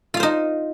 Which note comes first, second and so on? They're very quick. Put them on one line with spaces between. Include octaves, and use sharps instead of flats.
F4 F5 C5 D#4